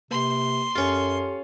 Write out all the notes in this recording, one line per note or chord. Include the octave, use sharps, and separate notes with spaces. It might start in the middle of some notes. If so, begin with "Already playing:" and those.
C3 A#3 B4 C6
F#2 C#4 F4 G4 A4 C#7